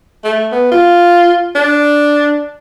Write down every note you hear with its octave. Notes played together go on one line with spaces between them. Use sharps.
A3
B3
F4
D4